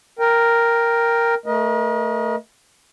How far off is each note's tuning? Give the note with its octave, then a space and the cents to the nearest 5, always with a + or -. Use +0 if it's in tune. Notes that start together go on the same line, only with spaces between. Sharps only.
A#4 +0 G5 +5
A3 +15 A#4 +40 D#5 +0